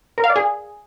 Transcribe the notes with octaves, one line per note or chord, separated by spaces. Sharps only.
A#4
F5
D5
G#4